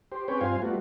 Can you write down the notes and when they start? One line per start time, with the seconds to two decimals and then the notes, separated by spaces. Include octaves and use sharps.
0.12 G4 C5
0.28 C4 C#4 G#4 B4 C#5 G5
0.41 G2 C4 F4 C5 F5 G#5
0.62 G3 A3 B3 F4 F#4